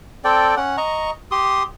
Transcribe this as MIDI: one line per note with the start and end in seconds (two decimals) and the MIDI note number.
0.24 0.55 60
0.24 0.55 69
0.24 0.55 74
0.24 0.55 79
0.57 0.77 61
0.57 0.77 78
0.77 1.11 75
0.77 1.11 82
0.77 1.11 85
1.31 1.63 67
1.31 1.63 84
1.31 1.63 87